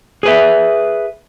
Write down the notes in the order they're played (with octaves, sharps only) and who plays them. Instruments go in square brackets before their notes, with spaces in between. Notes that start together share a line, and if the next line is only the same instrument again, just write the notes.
[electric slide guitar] G#4 B4 E5